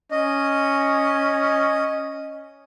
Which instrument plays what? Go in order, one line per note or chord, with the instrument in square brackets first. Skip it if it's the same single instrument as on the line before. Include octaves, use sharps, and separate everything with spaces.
[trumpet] C#4 [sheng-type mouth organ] D#5